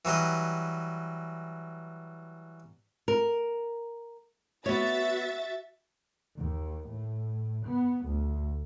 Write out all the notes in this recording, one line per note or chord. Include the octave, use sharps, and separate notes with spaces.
E3 F#3 G3 D#5
A#4
B3 F#4 C#5 E5 A6
D#2
A2
B3
D2